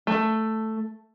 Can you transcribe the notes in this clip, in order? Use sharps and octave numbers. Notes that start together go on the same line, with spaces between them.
A3